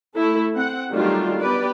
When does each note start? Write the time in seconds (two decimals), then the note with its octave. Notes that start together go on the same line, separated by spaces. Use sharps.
0.14 A3 E4 A4
0.55 C4 F#5
0.91 D#3 F#3 G3 A3 D4 F4
1.40 B3 G4 B4 D5